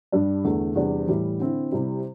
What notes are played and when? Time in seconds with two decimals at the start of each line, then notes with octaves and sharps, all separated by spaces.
0.12 G2 G3 D4
0.44 E2 D3 A3
0.76 E2 C3 G3 D4
1.07 A2 E3 G3 E4
1.39 D3 C4 E4
1.71 C3 G3 E4